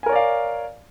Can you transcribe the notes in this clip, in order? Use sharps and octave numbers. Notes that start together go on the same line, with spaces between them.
A#4 C#5 D5 F5 G#5